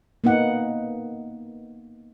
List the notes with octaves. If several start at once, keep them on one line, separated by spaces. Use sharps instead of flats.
A#3 B3 D#4 F#5